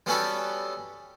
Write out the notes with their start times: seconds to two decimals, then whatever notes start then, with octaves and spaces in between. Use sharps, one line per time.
0.06 G3 B3 C#4 F#4 G4 A4